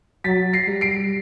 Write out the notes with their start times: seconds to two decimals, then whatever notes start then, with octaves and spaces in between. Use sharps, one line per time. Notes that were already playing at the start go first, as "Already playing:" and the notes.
0.24 F#3 A6 B6
0.53 A#6 C7
0.67 G3
0.81 C7 D7